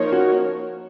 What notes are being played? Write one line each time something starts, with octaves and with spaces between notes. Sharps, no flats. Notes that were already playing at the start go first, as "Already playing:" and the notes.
Already playing: F3 A#3 D#4 A#4 C#5
F#4